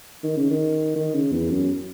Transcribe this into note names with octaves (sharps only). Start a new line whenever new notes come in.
D#3
C#3
D#3
D#3
C#3
E2
F#2